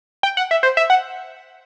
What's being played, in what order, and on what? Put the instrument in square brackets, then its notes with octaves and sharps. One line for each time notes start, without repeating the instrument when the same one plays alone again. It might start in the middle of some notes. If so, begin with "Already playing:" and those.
[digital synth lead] G5
F#5
E5
C5
E5
F#5